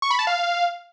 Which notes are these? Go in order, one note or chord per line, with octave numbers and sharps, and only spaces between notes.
C#6
B5
A5
F5